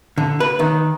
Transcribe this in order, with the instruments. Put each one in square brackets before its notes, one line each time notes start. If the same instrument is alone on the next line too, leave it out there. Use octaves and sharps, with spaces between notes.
[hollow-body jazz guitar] D3
B4
D#3